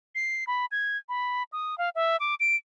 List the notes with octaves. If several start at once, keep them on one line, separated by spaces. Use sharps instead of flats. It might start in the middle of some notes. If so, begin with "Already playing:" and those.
C7
B5
G#6
B5
D#6
F5
E5
D6
D7